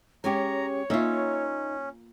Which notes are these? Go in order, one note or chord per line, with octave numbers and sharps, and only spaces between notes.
G#3 C#4 G4 C#5 G#5 A#5
A#3 C#4 D#4 F4 E5